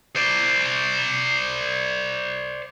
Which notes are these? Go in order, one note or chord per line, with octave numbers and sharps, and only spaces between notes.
C5 D5